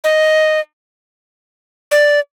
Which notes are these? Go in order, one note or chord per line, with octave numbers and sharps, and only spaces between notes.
D#5
D5